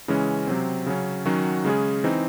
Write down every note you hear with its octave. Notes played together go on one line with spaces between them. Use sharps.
C#3 E3 G#3 C#4
C3 F#3 C4
C#3 F#3 C#4
D#3 F#3 C#4 F#4
C#3 G#3 C#4 G#4
E3 C4 D#4